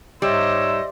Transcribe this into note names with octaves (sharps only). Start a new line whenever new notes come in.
G#2 G3 C5 C#5 D#5 E5 E6